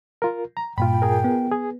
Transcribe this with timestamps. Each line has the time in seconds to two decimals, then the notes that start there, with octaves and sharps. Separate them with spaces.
0.22 F4 A#4
0.57 A#5
0.78 G2 A#2 F4 G5 B5
1.02 F4 G#4 A#4
1.24 B3
1.51 G#4